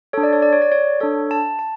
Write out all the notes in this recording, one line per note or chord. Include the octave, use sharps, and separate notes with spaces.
D4 A4 C#5
D5
C#5
D5
C#5
D5
C#5
D4 A4 C#5
A5
A5